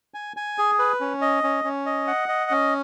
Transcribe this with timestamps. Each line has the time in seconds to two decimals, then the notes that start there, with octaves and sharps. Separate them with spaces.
0.14 G#5
0.37 G#5
0.58 G#4
0.79 B4
1.01 C#4
1.21 D#5
1.44 C#4
1.64 C#4
1.86 D#5
2.08 F#5
2.28 D#5
2.51 C#4